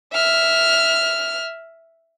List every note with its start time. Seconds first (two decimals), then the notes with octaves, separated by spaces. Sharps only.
0.13 E5 F6